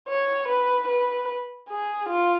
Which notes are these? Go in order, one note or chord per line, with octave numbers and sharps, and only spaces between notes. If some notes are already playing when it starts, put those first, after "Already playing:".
C#5
B4
B4
G#4
F4